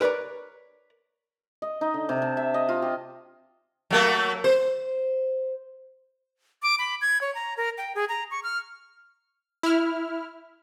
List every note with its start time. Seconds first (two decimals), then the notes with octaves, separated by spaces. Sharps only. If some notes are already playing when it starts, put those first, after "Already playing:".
0.01 A#4 B4 C#5 D5 A#5
1.62 D#5
1.81 D#4
1.94 D3
2.09 C3
2.22 A5
2.37 E5
2.54 D#5
2.69 F4
2.82 G4
3.90 F#3 A3 A#3
4.44 C5
6.62 D6
6.79 B5
7.01 G#6
7.21 C#5
7.35 A#5
7.57 A#4
7.78 G5
7.95 G#4
8.09 A#5
8.31 C#6
8.43 F6
9.63 E4 F6